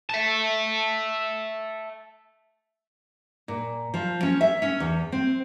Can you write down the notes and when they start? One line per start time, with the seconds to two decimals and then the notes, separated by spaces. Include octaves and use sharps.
0.10 E5 A5
3.48 A#2
3.94 F3
4.23 C#4
4.41 E5
4.62 C#4
4.80 E2
5.12 C4